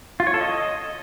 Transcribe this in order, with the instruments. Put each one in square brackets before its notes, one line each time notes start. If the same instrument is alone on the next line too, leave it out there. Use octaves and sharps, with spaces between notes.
[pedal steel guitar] F4
C#5
A4
D#5